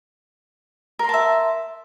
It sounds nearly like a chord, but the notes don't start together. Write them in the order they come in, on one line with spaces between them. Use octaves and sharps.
A#4 C6 A5 E5